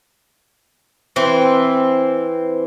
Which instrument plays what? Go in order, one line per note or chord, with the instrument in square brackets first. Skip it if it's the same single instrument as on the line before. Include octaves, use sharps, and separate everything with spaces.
[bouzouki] E3 C4